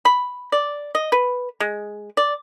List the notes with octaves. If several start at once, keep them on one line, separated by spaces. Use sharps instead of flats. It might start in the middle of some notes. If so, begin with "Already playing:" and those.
B5
D5
D#5
B4
G#3
D5